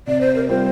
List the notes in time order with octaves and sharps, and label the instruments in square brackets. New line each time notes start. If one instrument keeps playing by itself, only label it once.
[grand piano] C3 [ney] D5
[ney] C5
A#4
[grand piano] G3 C4 F4 [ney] C5